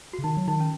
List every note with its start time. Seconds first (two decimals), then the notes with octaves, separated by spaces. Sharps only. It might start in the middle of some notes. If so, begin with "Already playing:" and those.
0.13 F#4
0.19 C#3
0.24 D#3 D#4
0.37 F#3
0.48 D#3 D#4
0.60 C#4